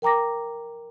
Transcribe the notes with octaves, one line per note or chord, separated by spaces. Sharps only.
A#4 G5 A#5 D6 A#6